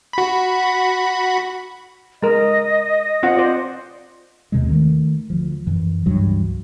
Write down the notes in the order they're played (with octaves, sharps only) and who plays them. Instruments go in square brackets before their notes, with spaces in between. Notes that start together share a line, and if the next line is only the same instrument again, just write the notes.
[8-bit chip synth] F#4 B5
[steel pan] G#3 A#4 [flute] D#5
[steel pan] C4 F4 F#5
C5 D5
[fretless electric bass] D#2 C3 G#3
D#3 A3
D2 F3
F#2 E3
C#2 G2 E3 F#3